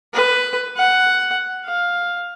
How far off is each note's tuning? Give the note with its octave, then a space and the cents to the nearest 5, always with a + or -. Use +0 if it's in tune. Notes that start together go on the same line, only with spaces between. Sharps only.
B4 +10
F#5 +5
F5 +10